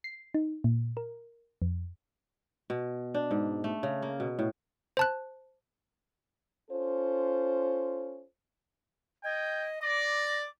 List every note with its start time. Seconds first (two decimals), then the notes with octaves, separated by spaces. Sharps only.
0.04 C7
0.34 D#4
0.64 A#2
0.97 A#4
1.62 F2
2.70 B2
3.14 D4
3.31 G#2
3.64 A3
3.83 C#3
4.02 A#3
4.20 B2
4.39 A2
4.97 C5 A5 F#6
6.71 C#4 F4 A4 C5
9.24 D#5 G5 G#6
9.82 D5 D6 A#6